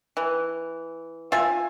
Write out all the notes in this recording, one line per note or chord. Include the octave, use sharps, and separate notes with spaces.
E3
F4 E5 G#5